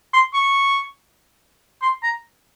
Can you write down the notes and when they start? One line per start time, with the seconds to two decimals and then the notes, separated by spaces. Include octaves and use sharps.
0.13 C6
0.34 C#6
1.82 C6
2.03 A#5